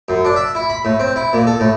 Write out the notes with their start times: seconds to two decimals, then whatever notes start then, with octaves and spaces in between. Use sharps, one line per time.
0.09 F#2
0.25 D4
0.36 E5
0.55 E4
0.70 B5
0.85 A2
1.00 C4
1.16 E4
1.33 A#2
1.47 A4
1.60 A2